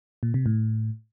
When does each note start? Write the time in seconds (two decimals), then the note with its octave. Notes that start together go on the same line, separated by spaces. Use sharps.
0.23 A#2
0.34 C3
0.46 A2